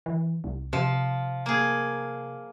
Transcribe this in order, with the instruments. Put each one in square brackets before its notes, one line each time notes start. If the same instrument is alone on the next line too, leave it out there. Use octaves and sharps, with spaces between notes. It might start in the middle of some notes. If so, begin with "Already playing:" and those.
[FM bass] E3
C2
[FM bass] C3 [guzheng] F3
[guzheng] A#3 G#4